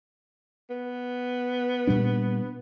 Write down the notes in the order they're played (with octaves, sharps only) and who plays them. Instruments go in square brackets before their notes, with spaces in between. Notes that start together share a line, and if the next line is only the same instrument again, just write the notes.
[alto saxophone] B3
[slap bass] A#2 G3 D4